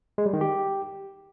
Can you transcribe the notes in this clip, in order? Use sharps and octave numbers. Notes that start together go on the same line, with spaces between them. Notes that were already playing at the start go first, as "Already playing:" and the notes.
G#3
G3
D#3
G4